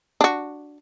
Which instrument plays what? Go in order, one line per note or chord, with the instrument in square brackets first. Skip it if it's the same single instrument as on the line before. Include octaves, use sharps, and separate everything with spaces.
[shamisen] D4 F#4